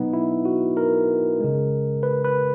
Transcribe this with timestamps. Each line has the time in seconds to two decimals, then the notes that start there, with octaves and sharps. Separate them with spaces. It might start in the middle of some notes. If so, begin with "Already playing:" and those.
Already playing: B2 F#3 B3 D#4 B4
0.13 E4
0.45 F#4
0.77 A#4
1.40 C#3 G#3
2.03 B4
2.24 B4